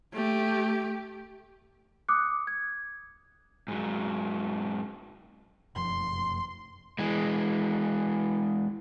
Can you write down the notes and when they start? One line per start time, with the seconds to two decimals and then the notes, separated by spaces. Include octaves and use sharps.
0.13 A3 G4
2.09 D6 D#6 F#6 C#7
2.47 G#6
3.68 G#2 F#3
5.75 F1 F#2 F3 C6
6.99 E3 G#3